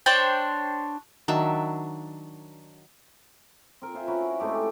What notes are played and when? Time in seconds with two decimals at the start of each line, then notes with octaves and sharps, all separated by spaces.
0.06 D4 C5 C#5 G5
1.28 D#3 F#3 D4 E5
3.82 C4 A#4
3.94 F4 C5 E5 G#5
4.07 C#4 F#4 A#4 B4
4.22 E4
4.40 C3 G#3 A3 G4
4.55 G4